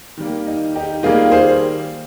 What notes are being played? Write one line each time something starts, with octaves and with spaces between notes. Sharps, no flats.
D#3 G3 A#3
D#4
D#4 G4
D#3 G3 A#3 F4 G#4
G#4 C5